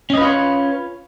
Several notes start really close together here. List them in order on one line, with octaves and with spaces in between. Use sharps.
C#4 D#5 B4 F4 C#5